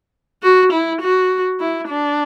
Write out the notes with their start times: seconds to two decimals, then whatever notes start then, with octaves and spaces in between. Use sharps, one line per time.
0.43 F#4
0.72 E4
1.00 F#4
1.60 E4
1.88 D4